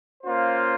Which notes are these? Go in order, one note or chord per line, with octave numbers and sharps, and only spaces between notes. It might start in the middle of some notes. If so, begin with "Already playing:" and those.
A#3 C#4 F4 C5